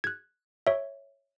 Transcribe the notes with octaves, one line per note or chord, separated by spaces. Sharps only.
F#6 G#6
C#5 E5